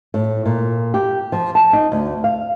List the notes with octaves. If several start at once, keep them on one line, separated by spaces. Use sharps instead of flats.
A2
A#2
G4
F3
A5
D#4
D2
F5